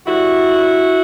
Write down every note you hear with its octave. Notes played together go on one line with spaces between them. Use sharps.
G2 D3 G3 E4 F#4